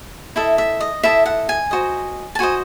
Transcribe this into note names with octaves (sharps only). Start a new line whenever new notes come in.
E4 A4 D#5 E5
E5
D#5
E4 A4 D#5 E5
F#5
G#5
F#4 C5 D#5
A5
F#4 C5 D#5 G#5